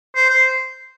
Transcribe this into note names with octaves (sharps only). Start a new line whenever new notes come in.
C5
C5